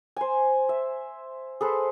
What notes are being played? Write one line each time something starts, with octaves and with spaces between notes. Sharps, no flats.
C5 G#5
E5
G#4 A4 B4 C5